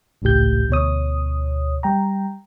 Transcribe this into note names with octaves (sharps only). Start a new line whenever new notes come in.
G#1 C#2 A2 G4 G6
D2 B2 C#5 D#6
G3 G5 A#5